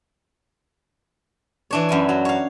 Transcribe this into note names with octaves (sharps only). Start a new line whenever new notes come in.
E3 D4 C#5
F#2 E4 G#5
F#3
C#5 F5